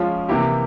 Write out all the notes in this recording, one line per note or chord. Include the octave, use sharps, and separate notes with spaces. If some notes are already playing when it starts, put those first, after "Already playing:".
Already playing: F3 G#3 C#4 F4
C3 E3 A#3 E4 G4